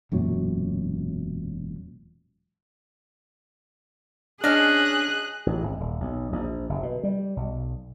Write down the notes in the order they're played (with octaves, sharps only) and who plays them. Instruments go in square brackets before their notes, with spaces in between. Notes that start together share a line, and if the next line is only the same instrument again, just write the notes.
[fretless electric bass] E1 F#2 A#2 F#3
[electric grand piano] C#4 D4 [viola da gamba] G#4 [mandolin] D#5 F6 [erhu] F#6
[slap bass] A1
G#1
D#1
B1
A#1
F#1
B2
G3
B1